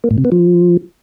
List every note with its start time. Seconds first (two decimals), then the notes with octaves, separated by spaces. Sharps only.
0.04 A#3
0.11 A2
0.18 C3
0.25 B3
0.32 F3